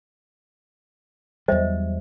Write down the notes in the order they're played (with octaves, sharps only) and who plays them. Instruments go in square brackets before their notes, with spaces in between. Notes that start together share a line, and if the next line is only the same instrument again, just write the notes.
[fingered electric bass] E2 F#3 G3 [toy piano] C5 D#5 E5